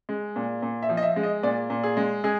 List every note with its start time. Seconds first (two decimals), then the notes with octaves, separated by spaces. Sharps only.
0.09 G#3
0.36 A#2
0.62 A#2
0.82 E5
0.89 F3
0.97 D#5
1.03 E5
1.16 G#3
1.23 D#5
1.43 A#2 D5
1.70 A#2
1.83 G#4
1.97 G#3
2.24 G#3 G#4